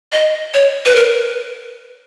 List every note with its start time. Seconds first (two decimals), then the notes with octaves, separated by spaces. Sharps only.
0.12 D#5
0.54 C#5
0.86 B4
0.96 A#4